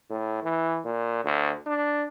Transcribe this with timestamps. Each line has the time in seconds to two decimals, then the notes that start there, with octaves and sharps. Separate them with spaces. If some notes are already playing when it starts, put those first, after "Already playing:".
0.10 A2
0.43 E3
0.85 A#2
1.24 D2
1.66 D4